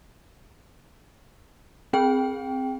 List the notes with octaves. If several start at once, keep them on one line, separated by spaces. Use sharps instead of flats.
C4 G#4 G5